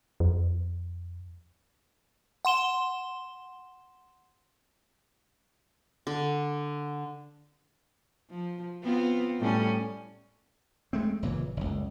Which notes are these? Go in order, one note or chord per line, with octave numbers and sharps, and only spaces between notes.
F2
F#5 C6 E7 G7
D3
F3
B3 C4 F4
A2 G3 C#4
G#3 A3 C4
F#1 A#2 E3
F#1 C#2